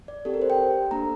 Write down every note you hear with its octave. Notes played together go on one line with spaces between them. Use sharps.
D5
C4 G4 A4
A#4
C5
G5
A#3 D4 A4 A#5